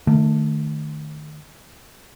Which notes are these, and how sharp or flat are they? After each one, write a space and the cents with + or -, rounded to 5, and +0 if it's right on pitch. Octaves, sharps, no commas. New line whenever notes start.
D#3 -35 A3 +0